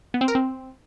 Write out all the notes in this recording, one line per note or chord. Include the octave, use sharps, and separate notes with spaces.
B3
C4
A#4
C4